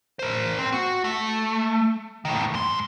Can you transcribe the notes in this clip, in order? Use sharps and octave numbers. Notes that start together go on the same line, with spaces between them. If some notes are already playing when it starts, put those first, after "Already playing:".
A#4 C5
C4
F#4
A3
A2 D#3
G#2 C6